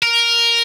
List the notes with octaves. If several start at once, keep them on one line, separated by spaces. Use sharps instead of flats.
A#4